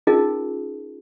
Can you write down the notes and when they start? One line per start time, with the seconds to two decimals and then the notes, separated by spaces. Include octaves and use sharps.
0.07 C#4 D#4 F4 G#4 A#4 D#5